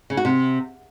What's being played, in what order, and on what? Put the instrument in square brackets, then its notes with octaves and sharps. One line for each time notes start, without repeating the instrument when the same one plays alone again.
[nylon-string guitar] C#3
F#4
C3